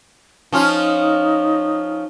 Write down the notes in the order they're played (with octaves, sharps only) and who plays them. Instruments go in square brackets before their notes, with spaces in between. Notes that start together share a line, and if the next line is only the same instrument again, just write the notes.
[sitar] F3 C#4 F4 [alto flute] D#4